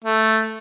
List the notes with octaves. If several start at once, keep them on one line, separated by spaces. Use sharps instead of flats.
A3